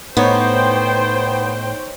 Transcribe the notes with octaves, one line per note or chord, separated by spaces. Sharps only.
A2 B3 D#4 C5 C#5 G5